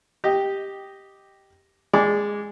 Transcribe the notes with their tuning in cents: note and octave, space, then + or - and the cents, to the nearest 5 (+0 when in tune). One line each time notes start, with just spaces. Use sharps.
G4 +0 D#5 -5
G#3 -10 D5 +0 D6 -15